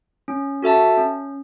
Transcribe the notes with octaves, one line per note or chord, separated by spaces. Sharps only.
C#4
F#4 A4 E5 A5
C#4